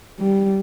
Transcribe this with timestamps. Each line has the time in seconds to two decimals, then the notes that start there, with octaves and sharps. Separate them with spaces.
0.20 G3